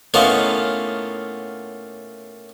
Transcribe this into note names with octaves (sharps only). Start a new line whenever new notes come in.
A2 A#3 B3 C#4 D#4 F4